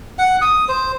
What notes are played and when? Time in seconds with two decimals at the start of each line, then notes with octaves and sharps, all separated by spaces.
0.19 F#5
0.41 D#6
0.69 C5